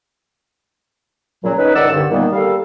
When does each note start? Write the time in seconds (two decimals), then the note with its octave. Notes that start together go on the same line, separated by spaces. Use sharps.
1.43 A#2 C#3 F#3
1.57 C#4 D#4 B4
1.75 C#2 D#3 D5 F#5 E6
1.90 C2 G2 D3 D#3
2.10 A#2 D#3 G3 A#3 B3
2.32 G3 A#3 A4 F5